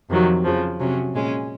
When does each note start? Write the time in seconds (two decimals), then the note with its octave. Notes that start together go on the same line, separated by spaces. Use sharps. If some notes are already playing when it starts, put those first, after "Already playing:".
0.09 F2 C3 D#3 F#3
0.44 F2 C#3 F3
0.79 C3 F#3 C#4
1.14 A#2 G#3 C#4